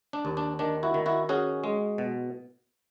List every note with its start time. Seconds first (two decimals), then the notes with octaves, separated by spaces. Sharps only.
0.13 D4
0.25 D#2
0.37 D4
0.59 D#3 D4
0.83 E4 F#4
0.94 D#3
1.06 E4 F#4
1.29 C#4 F#4 G#4
1.64 G#3
1.98 B2